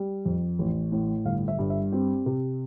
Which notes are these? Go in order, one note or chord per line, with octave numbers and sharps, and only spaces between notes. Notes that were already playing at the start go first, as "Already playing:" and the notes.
Already playing: G3
F2
A1
A2
G1 F5
E5
G2
E5
C4 G4
C3